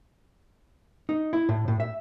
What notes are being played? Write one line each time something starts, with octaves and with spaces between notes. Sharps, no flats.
D#4
E4
A2
A2
E5